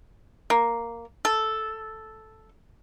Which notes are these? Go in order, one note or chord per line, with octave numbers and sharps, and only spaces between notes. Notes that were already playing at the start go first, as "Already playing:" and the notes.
A#3
A4